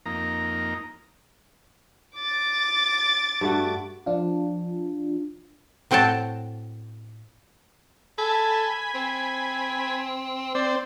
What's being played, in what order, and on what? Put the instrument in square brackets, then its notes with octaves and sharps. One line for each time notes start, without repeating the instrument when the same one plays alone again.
[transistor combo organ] F2 A#3 D#4 A#5
[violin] D6 A6
[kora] G2 A3 F#4
[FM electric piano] F3 D4 F4
[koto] A2 C4 F#4 G5 A5
[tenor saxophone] A4 [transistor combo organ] G#5 B5
[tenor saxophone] C4
[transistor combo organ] C4 C5 [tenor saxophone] D5